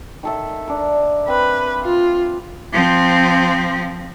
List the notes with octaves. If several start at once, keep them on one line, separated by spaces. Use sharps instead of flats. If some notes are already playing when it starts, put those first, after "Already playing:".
D#3 A4 E5
D4 A#4
C4 B4
F4
F3 C4